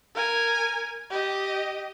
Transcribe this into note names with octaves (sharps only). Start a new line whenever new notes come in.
A#4 G#5
G4 D#5